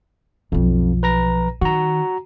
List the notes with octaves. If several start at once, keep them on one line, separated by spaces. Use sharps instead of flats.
B1 F2 F3
B4 A#5 A#6
D#3 F#4 A#5